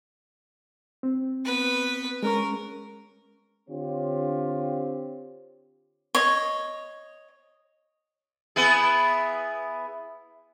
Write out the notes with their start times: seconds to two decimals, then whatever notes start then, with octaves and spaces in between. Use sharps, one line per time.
1.03 C4
1.45 B3 B4
2.23 G#3 C#4 A#4 C#6
3.69 D3 C4 F4 G4 C5 C#5
6.15 C#5 D#5
8.56 B3 E4 G#4